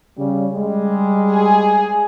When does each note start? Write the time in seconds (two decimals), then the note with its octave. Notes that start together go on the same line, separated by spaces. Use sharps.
0.17 C#3 G3
0.54 G3 G#3
1.35 G#4